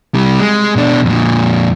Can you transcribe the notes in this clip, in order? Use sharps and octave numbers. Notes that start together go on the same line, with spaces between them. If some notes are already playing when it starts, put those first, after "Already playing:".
C3 G3
G#3
B2 D4
F2 A#2